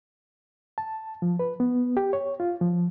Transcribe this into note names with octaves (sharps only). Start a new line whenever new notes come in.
A5
F3
B4
B3
G4
C#5
F4
F3